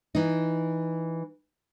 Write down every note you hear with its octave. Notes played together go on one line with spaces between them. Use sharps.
E3 D#4